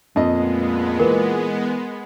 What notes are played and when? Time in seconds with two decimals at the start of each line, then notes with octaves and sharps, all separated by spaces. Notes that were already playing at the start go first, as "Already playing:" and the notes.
0.16 F2 A#2 G#3 B3 D#5
1.00 E3 A#4